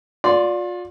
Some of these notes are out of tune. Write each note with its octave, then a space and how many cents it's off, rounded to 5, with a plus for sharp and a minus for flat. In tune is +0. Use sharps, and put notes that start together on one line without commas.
F4 +35 D5 -10 C6 -10